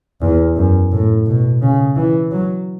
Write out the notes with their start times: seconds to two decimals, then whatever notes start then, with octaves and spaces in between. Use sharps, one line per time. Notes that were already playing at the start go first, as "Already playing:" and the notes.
0.21 E2
0.56 F#2
0.92 A2
1.26 B2
1.62 C#3
1.97 E3
2.32 F#3